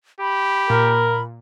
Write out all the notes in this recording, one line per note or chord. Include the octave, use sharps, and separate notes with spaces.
G4 B5
A#2 A#4